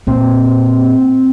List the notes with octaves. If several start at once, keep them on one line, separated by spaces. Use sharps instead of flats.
A#2 C4